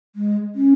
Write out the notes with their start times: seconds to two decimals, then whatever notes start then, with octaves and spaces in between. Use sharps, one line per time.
0.16 G#3
0.55 C#4